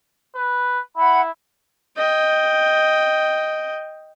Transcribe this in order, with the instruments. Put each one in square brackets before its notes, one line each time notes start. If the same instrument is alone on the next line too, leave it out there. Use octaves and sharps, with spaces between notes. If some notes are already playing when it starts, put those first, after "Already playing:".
[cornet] B4
[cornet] E4 [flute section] F#5 B5
[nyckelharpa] D#5 G5